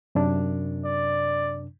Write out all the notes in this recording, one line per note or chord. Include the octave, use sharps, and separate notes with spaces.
F#2 C3 D4
D5